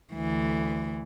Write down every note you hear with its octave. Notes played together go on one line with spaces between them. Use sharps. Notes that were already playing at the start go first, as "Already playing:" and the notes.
D2 E3